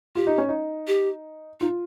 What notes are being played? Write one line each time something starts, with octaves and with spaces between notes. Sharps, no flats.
F4 G4
D#4
C#4
D#4
G4
D#4 F4